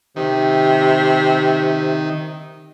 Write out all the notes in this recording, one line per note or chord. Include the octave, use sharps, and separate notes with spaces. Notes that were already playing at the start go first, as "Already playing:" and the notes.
C3 D#3